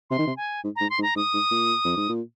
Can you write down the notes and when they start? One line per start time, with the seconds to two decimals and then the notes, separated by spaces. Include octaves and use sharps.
0.10 C3 C6
0.19 D#3
0.27 C3
0.37 G#5
0.64 G#2
0.76 G#2 A#5
0.90 C6
0.99 G#2
1.03 A#5
1.16 G#2 D#6
1.34 G#2
1.51 A#2
1.85 F2
1.97 G#2
2.09 A#2